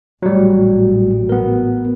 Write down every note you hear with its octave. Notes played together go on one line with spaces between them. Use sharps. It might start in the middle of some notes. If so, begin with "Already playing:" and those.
A1 A#2 F#3 G3 A3 F#4
B3 A#4